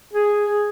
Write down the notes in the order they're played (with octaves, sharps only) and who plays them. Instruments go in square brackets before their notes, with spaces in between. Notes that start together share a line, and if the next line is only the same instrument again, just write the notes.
[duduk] G#4